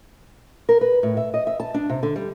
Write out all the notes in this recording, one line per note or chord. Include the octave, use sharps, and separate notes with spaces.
A#4
B4
A2
E5
D#5
E5
A5
D4
C3
D3
G3